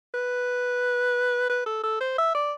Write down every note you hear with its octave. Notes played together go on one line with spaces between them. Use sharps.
B4
B4
A4
A4
C5
E5
D5